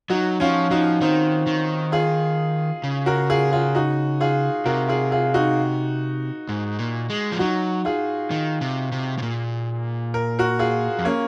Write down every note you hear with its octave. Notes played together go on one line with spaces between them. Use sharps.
F#3 D#4 F#4
F3 C#4 F4
F3 D#4 F#4
D#3 C4 D#4
D#3
F4 G#4
C#3
F#4 A#4
F4 G#4
F4 G#4
D#4 F#4
F4 G#4
C3 F#4 A#4
F4 G#4
F4 G#4
D#4 F#4
G#2
A#2
G#3
F3
F#3 D#4 F#4
F4 G#4
D#3
C3
C3
C3
A#2
A#4
F#4 A#4
F4 G#4
F2
A#3 C#4